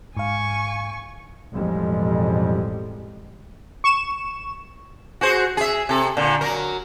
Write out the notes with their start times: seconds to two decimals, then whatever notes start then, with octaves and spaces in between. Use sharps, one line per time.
0.17 G#2 F5 G#5 C#6
1.52 A1 F2 B2 G3 G#3
3.84 C#6 E7
5.21 F#4 G#4 C5
5.57 G#4 E5
5.89 C3 A4
6.17 A#2 D3
6.41 F#3 A#4